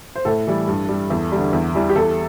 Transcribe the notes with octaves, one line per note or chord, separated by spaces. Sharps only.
C5
A2 A4
E3 G3
G2
G3
E2
D3 G3
E2
E3 G3
G4
E2 A4